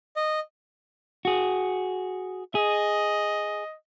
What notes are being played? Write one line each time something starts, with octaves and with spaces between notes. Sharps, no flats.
D#5
F#4 G#4
G#4 D#5